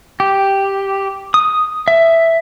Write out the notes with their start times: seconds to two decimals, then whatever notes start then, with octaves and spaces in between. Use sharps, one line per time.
0.20 G4
1.34 D#6
1.88 E5